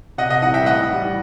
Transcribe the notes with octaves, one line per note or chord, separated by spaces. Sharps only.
C3 D#5 F#5
D#5 F#5
E3 G3 D#5 F#5
E5 G5
A2 D#5 F#5
E3 G3